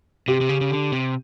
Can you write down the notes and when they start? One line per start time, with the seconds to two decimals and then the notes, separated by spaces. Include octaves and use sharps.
0.28 C3 G4
0.41 C3
0.49 C#3
0.61 C#3
0.71 D3
0.92 C3